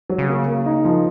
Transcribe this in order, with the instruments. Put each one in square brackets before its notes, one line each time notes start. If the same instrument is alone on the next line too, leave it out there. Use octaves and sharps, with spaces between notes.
[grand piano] F#3
[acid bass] C#3
[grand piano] A#3
A#3
D#4
F3